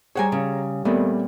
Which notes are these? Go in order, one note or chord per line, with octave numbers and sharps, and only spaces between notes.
G3 G#4 C5 C#5 F#5 G#5 A#5
C#3
A#2 D#3 G3 A3 B3 C4 D5